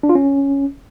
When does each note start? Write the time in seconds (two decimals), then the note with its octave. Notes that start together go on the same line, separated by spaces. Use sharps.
0.03 D4
0.09 F4
0.15 C#4